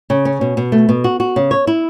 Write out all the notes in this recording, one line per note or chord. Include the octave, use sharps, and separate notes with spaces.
C#3
C#4
B2
B2
A3
B2
F#4
F#4
C#3
C#5
E4